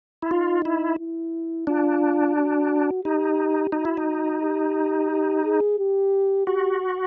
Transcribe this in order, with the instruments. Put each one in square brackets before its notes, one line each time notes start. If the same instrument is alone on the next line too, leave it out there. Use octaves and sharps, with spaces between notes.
[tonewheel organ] E4
[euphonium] D#4 [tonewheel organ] F4
[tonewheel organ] E4
[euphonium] E4
[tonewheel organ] D4 [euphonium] F4
[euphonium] F#4
[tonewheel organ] D#4 [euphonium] G4
[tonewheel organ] D#4 [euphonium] F#4
[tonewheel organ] E4
D#4
[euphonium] G4
G4
G#4
G4
[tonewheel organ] F#4 [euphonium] G4